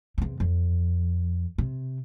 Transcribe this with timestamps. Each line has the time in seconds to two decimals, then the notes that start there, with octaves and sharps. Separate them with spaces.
0.18 E2 C3
0.40 F2
1.58 C3